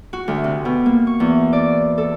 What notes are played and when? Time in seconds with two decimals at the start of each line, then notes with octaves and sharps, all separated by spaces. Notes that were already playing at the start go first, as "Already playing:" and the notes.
0.13 F#4
0.28 D2
0.44 C3
0.65 B2
0.86 A#3
1.07 C#6
1.20 E2
1.53 D5
1.98 A4